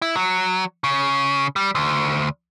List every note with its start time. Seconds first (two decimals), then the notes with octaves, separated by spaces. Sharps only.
0.02 E4
0.16 F#3
0.84 C#3
1.56 G3
1.75 D2